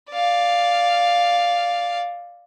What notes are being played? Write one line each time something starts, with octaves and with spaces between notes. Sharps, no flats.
D5 F5